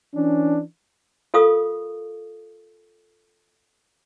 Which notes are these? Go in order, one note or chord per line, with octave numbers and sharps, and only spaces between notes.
E3 C#4 D4
F4 A4 A#4 F5 C#6 D#6